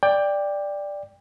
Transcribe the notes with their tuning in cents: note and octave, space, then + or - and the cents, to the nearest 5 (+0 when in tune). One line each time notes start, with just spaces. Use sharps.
D5 +0 G5 +20